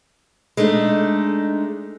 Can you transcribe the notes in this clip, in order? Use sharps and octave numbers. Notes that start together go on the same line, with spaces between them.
G#3 A3 D4 D#4